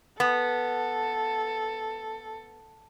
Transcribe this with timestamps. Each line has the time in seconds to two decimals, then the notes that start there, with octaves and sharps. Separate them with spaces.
0.20 B3 A4